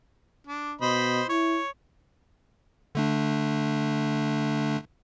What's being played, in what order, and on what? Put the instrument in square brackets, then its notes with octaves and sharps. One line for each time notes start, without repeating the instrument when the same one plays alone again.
[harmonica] D4
[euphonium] B2 [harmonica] C5 D#5 B5
[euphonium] E4 [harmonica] C#5
[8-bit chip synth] D3 A3 D4